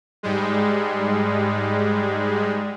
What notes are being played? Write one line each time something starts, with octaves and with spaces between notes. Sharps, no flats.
G#2 G3 G#3